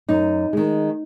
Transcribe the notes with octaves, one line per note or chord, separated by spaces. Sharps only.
F#2 D#4
D#3 G#3